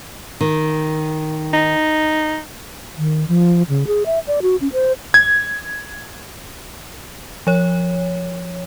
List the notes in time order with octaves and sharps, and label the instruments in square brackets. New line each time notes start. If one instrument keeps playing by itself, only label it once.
[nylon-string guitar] D#3
[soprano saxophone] D#4
[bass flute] D#3
F3
C#3
G#4
E5
D5
F#4
C#4
C5
[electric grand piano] G#6
[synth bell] F3 C#5